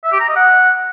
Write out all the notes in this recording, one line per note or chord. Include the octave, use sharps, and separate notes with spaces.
E5
G4
A#5
D#5
F#5